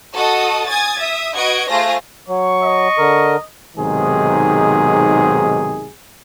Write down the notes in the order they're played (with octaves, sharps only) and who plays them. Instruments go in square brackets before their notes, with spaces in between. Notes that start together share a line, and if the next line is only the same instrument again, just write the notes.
[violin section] F#4 A4 D#5 A5 D#6
G#5 D#6 G#6 A6
E5 D#6
F#4 B4 D#5 F#5 G#6 D7
A3 F4 G#4 C5 F5 A#6
[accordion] F#3 [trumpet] C#6
[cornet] D#5
[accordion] D3 A#4
[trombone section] B1 G#2 C3 D#3 G#4